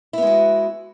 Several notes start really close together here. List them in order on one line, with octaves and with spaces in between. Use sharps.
E4 B3 G#3 F#4